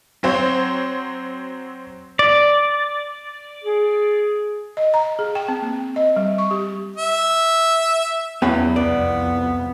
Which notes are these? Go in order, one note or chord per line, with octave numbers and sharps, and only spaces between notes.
F#3 C4 C5 C#5
D5
G#4
D#5
A#5
G#4
G5
C4
A#3
D#5
G3
C#6
G4
E5
E2 F#3 C#4 B4
C2 F2 B3 D5